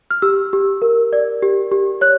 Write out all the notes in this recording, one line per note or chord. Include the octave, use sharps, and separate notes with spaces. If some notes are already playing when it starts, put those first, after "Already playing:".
F6
G4 E6
G4
A#4
D5
G4
G4
C#5 F#6